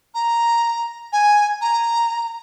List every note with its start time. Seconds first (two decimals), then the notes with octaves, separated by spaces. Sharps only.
0.15 A#5
1.13 G#5
1.61 A#5